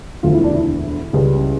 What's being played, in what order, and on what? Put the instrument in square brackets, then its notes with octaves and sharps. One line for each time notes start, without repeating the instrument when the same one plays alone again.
[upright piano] E1 D2 D3 F3 F4
E4
D4
E4
C#2 C#3 G3